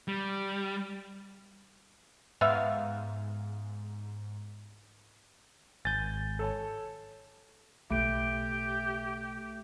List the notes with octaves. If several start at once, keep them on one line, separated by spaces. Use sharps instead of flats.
G3
G#2 B3 E5 F5
G#1 G#5 G6 A6
A4 C#5 A5
B1 C#3 A3 G4 D7